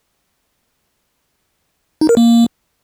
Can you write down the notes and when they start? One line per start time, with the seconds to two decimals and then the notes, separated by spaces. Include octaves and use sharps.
2.01 D#4
2.09 A#4
2.17 A#3